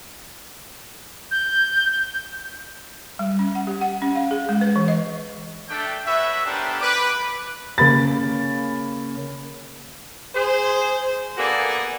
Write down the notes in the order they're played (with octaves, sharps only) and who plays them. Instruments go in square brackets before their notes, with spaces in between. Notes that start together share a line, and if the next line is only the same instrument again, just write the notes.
[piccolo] G6
[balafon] G3
C#4
F#5
G4
F#5
C#4
F5
G#4
G#3
B4
E3
D#5
[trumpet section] A3 D4 G5
F#4 B4 C#5 E5
B3 D4 G4 A4 A#4 C5
B4 D6
[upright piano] C#3 A#3 B5 A6
[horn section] G#4 C5
A#3 B3 D4 F#4 G#4 A4